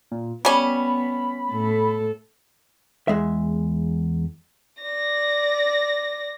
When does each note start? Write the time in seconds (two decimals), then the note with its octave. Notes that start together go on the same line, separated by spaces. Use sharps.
0.11 A#2
0.45 G3 B3 C#4 B5
1.51 A2 A4
3.08 E2 G#3 E5
4.83 D5 A#6